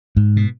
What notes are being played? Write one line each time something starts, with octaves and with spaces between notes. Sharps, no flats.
G#2
B2